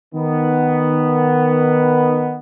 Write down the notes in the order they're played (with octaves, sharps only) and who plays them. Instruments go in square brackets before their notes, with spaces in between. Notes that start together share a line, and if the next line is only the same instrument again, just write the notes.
[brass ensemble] D#3 B3